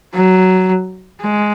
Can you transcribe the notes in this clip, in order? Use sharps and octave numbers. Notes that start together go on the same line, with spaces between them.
F#3
G#3